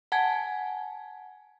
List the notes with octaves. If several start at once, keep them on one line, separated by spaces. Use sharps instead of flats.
F#5 G#5 A5 G#6